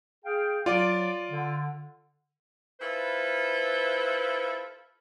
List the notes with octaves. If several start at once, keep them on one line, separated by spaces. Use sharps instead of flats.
G#4 F5 G5
F#3 F4 D5 D6
D3
E4 F4 A4 B4 C5